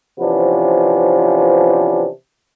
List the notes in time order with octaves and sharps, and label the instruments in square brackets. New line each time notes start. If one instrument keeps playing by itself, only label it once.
[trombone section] C3 E3 F3 B3 C#4 D4